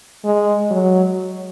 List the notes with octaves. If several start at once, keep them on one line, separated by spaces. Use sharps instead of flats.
G#3
F#3